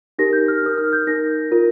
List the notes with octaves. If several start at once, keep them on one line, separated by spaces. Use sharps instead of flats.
D#4 G4 A#4 A#6
G6
F6
D#4 A#4 D#6
F6
G6
D#4 A#4 A#6
F4 A#4